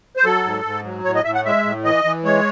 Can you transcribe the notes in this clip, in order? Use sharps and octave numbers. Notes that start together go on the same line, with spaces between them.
C5
F#3 A4
G#2
G#2
F#3
A2 C#5
D#5
A2 E5
F#5
G#3 E5
A2
E3 D#5
E3
G#3 C#5